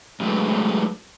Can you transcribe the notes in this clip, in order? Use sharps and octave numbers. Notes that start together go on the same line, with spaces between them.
G2 F#3 G#3 A3 B4